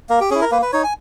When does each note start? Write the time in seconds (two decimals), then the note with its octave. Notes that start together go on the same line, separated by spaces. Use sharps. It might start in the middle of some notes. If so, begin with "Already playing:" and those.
0.09 A#3 A#4
0.20 G4
0.30 C#4 E4 G#4
0.41 A#4
0.51 A#3 B4
0.62 B4
0.73 D#4 C#5
0.84 G#5